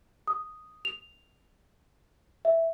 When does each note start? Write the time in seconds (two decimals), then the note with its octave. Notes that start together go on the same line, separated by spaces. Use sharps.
0.27 D#6
0.85 F7
2.45 E5